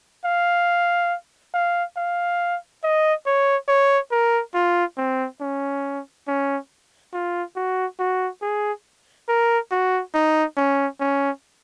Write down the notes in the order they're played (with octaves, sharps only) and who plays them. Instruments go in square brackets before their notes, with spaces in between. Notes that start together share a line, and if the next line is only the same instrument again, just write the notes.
[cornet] F5
F5
F5
D#5
C#5
C#5
A#4
F4
C4
C#4
C#4
F4
F#4
F#4
G#4
A#4
F#4
D#4
C#4
C#4